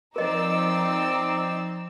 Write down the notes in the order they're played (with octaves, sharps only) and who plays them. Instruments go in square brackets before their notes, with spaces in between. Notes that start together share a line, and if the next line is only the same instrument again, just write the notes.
[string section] F3 D#4 E6 [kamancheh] C4 D5 [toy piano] A#4 D#5